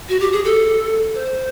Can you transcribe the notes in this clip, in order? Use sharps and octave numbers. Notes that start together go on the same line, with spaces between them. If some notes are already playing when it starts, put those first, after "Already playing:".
F#4
G4
G#4
A4
C5